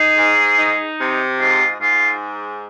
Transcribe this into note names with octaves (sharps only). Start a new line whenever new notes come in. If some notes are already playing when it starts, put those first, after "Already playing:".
Already playing: D#4 G#4
G#2
D#4
C3
G#2 F4
G#2 F4